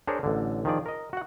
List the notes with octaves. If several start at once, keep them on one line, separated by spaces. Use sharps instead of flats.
D4 G#4 A#4 C5 C#5
A1 D3
D#3 F3 G#4 D5
A#4 D#5
F#4 F#5